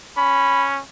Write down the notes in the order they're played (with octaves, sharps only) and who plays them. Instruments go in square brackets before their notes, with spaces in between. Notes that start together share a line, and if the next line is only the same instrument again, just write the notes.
[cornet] C#4 [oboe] B5